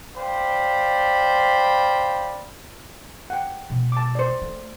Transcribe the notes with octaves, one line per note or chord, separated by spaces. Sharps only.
C5 D5 F5 G5 B5
F#5 G5
B2 G#3
A5 D6
C5 D5
A3